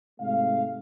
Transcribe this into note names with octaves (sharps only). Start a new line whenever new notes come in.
G#2 C3 A3 F5